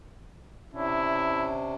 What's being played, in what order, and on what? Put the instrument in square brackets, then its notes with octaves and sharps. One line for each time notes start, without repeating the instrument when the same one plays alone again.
[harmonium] C3 C#4 D4 [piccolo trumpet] E4